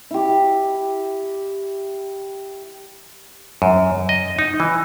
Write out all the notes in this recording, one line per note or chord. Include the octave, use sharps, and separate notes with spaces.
E4 G4
F#2
D#5
D#4
E3